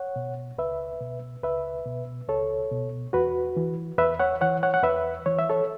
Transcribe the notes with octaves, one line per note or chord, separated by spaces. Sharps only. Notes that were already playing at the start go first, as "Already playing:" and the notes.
Already playing: C#5 F#5
B2
C#2 B4 E5
B2
C#2 B4 E5
B2
C#2 A4 C#5
B2
E2 F#4 B4
E3
E2 B4 E5
C#5 F#5
E3 C#5 F#5
C#5 F#5
F#5
E2 B4 E5
E3 C#5
E5
A4 C#5